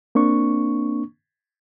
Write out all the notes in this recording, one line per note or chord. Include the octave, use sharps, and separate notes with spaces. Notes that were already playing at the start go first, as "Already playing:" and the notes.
A#3 C4 D4 C#6